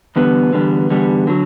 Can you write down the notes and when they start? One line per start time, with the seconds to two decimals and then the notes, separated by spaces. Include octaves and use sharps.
0.16 E2 D3 G3 B3
0.52 E2 D3 G3 B3
0.90 E2 D3 G3 B3
1.27 D3 F#3